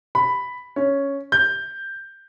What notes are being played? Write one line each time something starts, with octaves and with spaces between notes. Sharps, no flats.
B5
C#4
G6